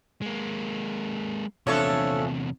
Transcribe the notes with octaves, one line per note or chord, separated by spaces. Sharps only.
G#3 A#3
E2 C3 F3 A3 C#4 D4 A4 C#5